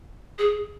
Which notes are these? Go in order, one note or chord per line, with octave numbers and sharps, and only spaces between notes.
G#4